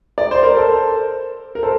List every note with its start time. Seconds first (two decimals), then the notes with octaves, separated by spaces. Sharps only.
0.18 D5
0.31 C5
0.43 A#4
0.57 A4 C5
1.55 A#4
1.63 A4 C5